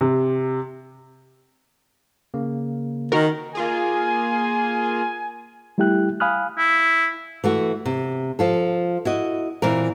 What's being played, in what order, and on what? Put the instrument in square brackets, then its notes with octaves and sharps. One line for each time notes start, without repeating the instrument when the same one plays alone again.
[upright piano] C3
[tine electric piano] C#3 A#3
[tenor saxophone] D#3 [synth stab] F#4 A#4
[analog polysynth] A#3 F4 G#4 [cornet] G#5
[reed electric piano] G3 A3 E4 G4 G5 F#6
F5 G#5 B5 D#6 F6 F#6
[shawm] E4
[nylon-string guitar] E3 A3 F#4
C3
F3 F4 A4
E4 F#4 D#5
A#2 E3 C4 A#4